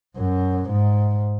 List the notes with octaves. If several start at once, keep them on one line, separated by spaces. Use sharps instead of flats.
F#2
G#2